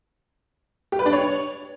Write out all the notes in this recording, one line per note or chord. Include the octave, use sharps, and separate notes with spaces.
G4
B4
D4
C#5